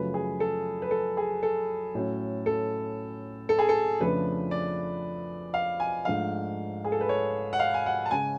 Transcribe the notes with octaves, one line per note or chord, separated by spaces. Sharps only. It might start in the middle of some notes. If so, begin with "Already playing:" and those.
Already playing: F#2 C#3 F3 A3 B4
G#4
A4
B4
A4
G#4
A4
A2 F#3 C#4
A4
A4
G#4
A4
F2 C#3 F3 A3 D4 B4
D5
F5
G#5
G#2 F3 A3 D4 F5
G#4
A4
B4
C#5
F#5
F5
G#5
F#5
A5
C#3 G#3 C#4 G#5